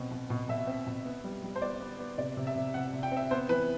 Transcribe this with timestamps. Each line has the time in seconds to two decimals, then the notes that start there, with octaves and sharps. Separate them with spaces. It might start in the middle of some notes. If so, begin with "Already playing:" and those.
Already playing: B2 C4
0.11 B2
0.30 B2
0.49 B2 E5
0.67 C4
0.86 B2
1.05 B3
1.24 G3
1.43 G3
1.56 C5
1.62 B3 D5
1.81 B3
1.99 B3
2.18 C3 D5
2.37 C3
2.47 E5
2.56 C3
2.74 C3 F#5
2.93 C3
3.03 G5
3.12 C4 E5
3.31 B3 C5
3.49 E3 B4